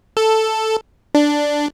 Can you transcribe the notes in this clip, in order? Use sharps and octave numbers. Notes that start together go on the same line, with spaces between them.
A4
D4